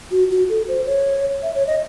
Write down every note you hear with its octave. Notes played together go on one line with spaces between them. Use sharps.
F#4
F#4
A4
C5
C#5
E5
C#5
D#5